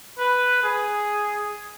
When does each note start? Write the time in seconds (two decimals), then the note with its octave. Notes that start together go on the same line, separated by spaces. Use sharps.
0.18 B4
0.63 G#4